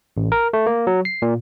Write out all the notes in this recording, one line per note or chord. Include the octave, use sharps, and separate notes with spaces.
A1
A#4
A3
A#3
F#3
C7
A#2